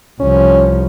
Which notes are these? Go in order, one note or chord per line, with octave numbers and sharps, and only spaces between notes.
C2 F3 C#4